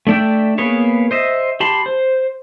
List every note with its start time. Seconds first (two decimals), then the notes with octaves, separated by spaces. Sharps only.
0.07 A3 D4 D5 E5 G5
0.58 A#3 B3 G#4 B4 C#5
1.11 C5 D#5 E5
1.60 G4 A5 B5 C6
1.86 C5